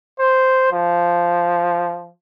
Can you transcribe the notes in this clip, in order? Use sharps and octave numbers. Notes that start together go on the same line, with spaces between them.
C5
F3